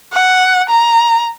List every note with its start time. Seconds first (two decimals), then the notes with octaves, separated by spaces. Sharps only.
0.13 F#5
0.69 A#5